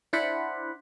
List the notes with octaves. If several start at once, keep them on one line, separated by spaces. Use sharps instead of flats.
D4 E4 C5 D5 F#5 B5